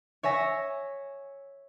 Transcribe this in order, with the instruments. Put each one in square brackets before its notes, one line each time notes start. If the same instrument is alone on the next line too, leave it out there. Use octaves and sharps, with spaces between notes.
[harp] C#5 E5 G#5 A#6